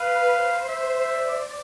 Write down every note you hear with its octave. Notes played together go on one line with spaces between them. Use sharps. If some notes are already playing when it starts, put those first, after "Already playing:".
Already playing: B4 F5
C5
E5
D5